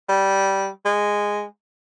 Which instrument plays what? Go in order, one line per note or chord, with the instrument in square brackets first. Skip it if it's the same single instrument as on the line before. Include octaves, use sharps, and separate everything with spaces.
[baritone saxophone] G3
G#3